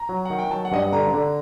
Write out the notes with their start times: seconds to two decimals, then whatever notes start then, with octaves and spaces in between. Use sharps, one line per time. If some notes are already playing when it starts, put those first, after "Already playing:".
Already playing: A#5
0.09 F#3
0.25 D#3 F#5
0.39 G5
0.51 F#3 A5
0.65 F#5
0.72 G2 D#5
0.79 F#5
0.93 D3 A#5
1.14 D3